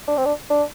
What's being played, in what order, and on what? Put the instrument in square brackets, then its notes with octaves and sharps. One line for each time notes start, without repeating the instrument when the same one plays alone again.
[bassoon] D4
C4
D4
D4